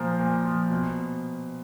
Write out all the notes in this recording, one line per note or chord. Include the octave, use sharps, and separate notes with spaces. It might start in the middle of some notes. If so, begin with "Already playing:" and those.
Already playing: A#2 F3 A#4 C5
A#2
F3
B2